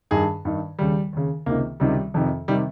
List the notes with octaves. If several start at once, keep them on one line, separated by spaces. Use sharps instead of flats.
G2 D#3 G#4
G2 D#3
D#2 C#3 G3
D#2 C#3
C#2 C3 D#3 A#3
C#2 C3 D#3 G3
F2 C3 D#3
C3 D#3 G3